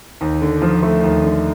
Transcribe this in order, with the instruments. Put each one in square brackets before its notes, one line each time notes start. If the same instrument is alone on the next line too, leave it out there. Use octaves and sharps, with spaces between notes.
[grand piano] D#2
D3
F3
A3
D#2
D3